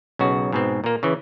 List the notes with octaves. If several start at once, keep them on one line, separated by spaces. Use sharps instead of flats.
B1 C#3 F#4
G#2 B2 C4
A#2 A#3
C#3 E3